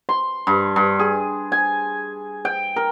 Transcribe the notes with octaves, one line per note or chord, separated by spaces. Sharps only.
C6
G2
G2
G#4
G#5
G5
A#4